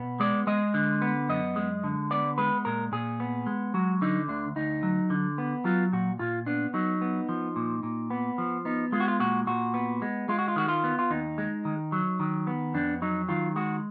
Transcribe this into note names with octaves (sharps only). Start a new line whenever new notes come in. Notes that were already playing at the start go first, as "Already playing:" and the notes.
Already playing: B2 B3
G#3 D5
G#3 D#5
D3
B3
F#2 D#5
G#3
D3
B3 D5
G#3 B4
A#2 A#4
A#2 G#4
B3
G#3
F#3 F#4
D3 D#4
D2 D4
D2 D#4
F#3
D3
B3
F#3 F4
A#2 F#4
A#2 F4
B3 D4
F#3 D#4
B3
F3
A#2
A#2
B3
F3
B3 D#4
G#3 F4
F#4
F4
A#2 F#4
A#2 F#4
B3
G#3
G#3 F4
F#4
F4
D#3 F#4
F4
B3
F4
D#2 D#4
G#3
D#3
F#3
D#3
B3
F2 D4
F#3 D#4
D#3 F4
G#3 F#4